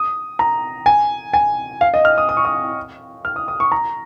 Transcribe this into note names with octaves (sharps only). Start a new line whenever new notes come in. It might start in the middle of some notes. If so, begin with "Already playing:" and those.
Already playing: D#6
A#5
G#5
G#5
F5
D#5
F6
D#6
D#6
C#6
D#6
F6
D#6
D#6
C#6
A#5